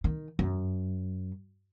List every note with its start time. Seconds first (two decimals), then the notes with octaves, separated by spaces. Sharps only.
0.04 D#3
0.39 F#2